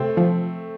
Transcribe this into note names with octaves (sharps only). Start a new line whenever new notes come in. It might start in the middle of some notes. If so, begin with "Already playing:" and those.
Already playing: C3 A3 C4
F3